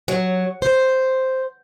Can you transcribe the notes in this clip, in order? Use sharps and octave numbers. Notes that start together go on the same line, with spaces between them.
F#3
C5